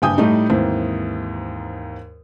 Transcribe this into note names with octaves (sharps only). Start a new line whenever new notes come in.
F#1 G2 G5 G#5 D#6 G6
A2 G3 A3 D#4
D#2 G#2 E3 C4